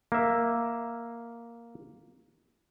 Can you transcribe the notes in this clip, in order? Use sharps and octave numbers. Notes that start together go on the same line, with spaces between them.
A#3 E5